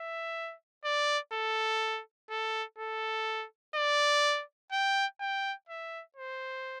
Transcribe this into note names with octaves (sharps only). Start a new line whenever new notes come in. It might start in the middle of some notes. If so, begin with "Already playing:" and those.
Already playing: E5
D5
A4
A4
A4
D5
G5
G5
E5
C5